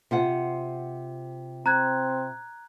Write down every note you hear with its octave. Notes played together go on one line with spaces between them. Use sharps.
C3 F4 F#5
C4 A#5 F#6 G#6